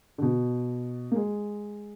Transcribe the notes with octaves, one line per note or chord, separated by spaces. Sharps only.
D3
B2
A#3
G#3